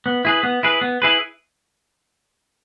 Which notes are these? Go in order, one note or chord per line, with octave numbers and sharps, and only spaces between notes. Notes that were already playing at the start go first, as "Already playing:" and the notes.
B3
E4 G#4 B4
B3
E4 G#4 B4
B3
E4 G#4 B4